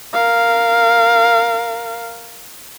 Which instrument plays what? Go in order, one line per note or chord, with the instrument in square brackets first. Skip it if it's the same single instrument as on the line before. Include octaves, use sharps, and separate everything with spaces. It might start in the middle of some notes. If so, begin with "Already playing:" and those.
[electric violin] A#4 F5